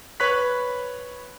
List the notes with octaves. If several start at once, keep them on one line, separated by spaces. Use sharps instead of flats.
B4 C#5 B5 F#6 B6